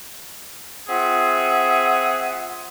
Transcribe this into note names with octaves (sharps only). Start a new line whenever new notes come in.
C4 F4 G#4 E5 F#5